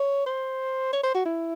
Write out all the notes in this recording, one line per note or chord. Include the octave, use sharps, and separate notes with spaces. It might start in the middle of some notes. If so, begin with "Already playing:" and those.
Already playing: C#5
C5
C#5
C5
F#4
E4